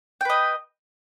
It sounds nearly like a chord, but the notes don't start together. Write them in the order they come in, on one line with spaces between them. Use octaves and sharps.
G5 B4 D#5